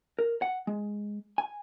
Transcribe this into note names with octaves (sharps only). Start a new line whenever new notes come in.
A#4
F#5
G#3
G#5